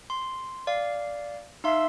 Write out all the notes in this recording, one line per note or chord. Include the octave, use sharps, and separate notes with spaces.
C6
D5 F5
D#4 E5 F5 C6